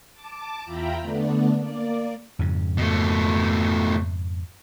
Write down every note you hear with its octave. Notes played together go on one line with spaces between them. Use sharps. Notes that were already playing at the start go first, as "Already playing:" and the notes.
A5 D6
E2 F4 E5 G5 A#5 B5
D3 A3 B3 D4
A#3 D5
F2 G#2 C#3
B2 A3